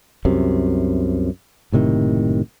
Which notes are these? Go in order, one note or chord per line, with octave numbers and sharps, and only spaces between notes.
C2 F#2 C3
F#1 A2 C3 D#3